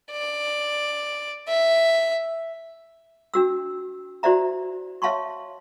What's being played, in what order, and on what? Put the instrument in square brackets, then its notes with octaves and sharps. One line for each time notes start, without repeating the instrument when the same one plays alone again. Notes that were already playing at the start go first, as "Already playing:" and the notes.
[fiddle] D5
E5
[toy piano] D4 F#4 E6
E4 F#4 C5 D5 E5 A#5
C#5 E5 F5 A5 C6 C#6